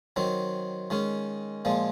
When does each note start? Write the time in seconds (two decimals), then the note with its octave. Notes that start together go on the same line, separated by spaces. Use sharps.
0.16 D#3 F#3 C4
0.90 D#3 G#3 C#4
1.65 A#2 F3 G#3